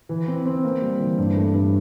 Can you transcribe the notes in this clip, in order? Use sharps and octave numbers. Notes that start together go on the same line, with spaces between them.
E3
C4
C4
A#3
G3
E3
G2
A3
G2